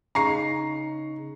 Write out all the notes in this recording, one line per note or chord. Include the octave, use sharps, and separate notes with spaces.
C#3 D#4 A#5 C#6 C7